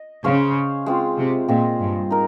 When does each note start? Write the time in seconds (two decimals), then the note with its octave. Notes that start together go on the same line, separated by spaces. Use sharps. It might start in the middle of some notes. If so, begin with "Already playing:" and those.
Already playing: D#5
0.24 C#3 C#4 G#4 C5 F5
0.86 G#3 C4 F4
1.18 C3
1.48 A#2 C4 F4 G#4 D#5
1.80 G2
2.11 D#4 A#4